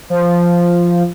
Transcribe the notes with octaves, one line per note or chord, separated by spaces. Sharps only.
F3